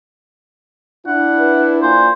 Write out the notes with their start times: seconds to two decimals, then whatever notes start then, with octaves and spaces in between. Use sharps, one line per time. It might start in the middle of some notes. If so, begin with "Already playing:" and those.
1.07 D4 E4 F#5
1.40 B4
1.83 A#2 C5